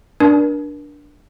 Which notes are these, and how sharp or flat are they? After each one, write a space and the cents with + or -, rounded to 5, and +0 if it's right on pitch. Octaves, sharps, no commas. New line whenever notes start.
D4 +0 A#4 +40 A5 -45